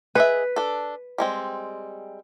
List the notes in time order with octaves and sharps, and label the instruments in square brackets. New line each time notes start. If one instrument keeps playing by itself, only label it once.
[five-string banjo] G#4 D#5 E5 [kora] B4
[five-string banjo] D4 A4
G3 G#3 C4